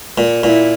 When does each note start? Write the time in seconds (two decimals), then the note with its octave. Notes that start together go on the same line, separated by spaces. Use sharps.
0.18 A#2
0.43 A#2 E4